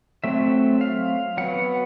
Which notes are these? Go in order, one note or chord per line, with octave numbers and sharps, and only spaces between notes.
F#3 A3 C4 E5
F5
F#3 B3 F#5